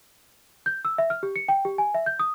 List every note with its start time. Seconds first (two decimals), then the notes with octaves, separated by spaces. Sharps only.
0.66 G6
0.85 E6
0.98 E5
1.10 F6
1.23 G4
1.36 C#7
1.49 G5
1.65 G4
1.78 G#5
1.95 E5
2.06 G6
2.19 D#6